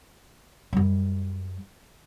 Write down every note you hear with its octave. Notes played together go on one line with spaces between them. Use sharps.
F#2 G3